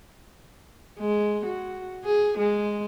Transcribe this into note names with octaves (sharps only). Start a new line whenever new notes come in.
G#3
F#4
G#4
G#3